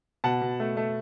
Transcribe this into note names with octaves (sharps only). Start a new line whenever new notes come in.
B2 F#5 A5
B2
A3
A3